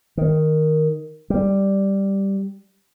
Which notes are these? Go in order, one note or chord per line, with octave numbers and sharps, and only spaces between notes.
D#3
G3